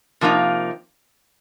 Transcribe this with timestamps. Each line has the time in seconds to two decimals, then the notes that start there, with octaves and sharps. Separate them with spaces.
0.21 C3 F3 A#3 D#4